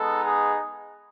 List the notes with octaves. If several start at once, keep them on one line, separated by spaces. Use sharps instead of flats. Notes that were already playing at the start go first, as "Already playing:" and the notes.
Already playing: G#3 B3 D#4 A4
G#4